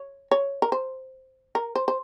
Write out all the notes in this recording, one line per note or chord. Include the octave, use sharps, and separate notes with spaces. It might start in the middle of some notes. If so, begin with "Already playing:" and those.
Already playing: C#5
C#5
A#4
C5
A#4
C5
C5